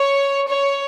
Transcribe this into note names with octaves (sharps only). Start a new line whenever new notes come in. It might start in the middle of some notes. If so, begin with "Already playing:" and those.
Already playing: C#5
C#5